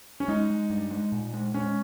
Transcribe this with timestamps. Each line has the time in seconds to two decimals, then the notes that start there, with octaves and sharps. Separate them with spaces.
0.20 C#4
0.28 G#3 D#4
0.50 G#3
0.70 G2
0.91 G#3
1.12 A#2
1.33 G#3
1.54 G#3 C#4